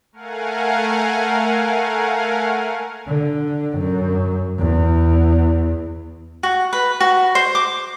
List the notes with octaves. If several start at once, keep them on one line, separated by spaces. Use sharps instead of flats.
A3 A#4 F5 F#5 G#5
D3
F#2
E2
F#4
B4
F#4
C5
D6